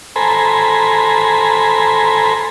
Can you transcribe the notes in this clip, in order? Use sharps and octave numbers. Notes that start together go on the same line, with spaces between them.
A4 C5 G#5 A#5 B5